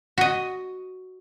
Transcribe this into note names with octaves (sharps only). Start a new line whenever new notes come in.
F#4 D#5